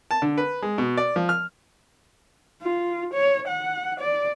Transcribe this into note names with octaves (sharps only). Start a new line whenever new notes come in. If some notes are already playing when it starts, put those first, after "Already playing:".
A5
D3
B4
G#3
B2
D5
F3
F6
F4
C#5
F#5
D5